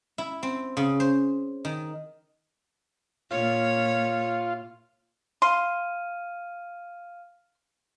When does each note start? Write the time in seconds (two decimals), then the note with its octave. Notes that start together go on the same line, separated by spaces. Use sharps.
0.18 E4
0.43 C4
0.77 C#3
1.00 C5
1.65 D#3
3.31 A#2 F4 C#5
5.42 F5 C6 F6 D#7